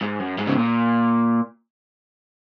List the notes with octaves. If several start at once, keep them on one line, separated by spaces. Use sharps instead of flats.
G#2
F#2
G#2
C#3
A#2